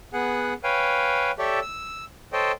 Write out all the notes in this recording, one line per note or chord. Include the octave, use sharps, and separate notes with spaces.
B3 G#4 F#5
B4 C#5 F5 G5 G#5
G4 A4 C#5 D5 E5
E6
A4 C5 C#5 D#5 G5